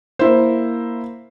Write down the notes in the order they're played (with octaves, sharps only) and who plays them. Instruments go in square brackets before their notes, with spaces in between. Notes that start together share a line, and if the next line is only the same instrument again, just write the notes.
[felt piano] A#3 E4 C5